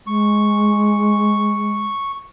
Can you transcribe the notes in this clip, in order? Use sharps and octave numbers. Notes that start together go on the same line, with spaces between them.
G#3 C#6